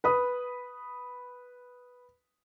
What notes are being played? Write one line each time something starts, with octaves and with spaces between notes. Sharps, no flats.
B4 B5 D#6